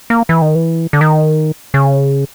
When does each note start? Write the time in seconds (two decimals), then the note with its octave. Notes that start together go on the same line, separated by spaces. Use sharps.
0.10 A#3
0.29 E3
0.42 D#3
0.55 E3
0.93 D3
1.01 D#3
1.74 C#3